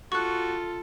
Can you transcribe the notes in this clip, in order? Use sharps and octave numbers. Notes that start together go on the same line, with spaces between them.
F4 F#4 A4 C#6 F#6